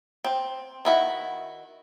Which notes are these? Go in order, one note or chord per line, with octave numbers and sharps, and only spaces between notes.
C4
D#3 E4 F#4